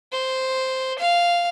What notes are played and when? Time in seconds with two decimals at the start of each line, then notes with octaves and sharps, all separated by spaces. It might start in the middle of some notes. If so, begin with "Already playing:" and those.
0.12 C5
0.99 F5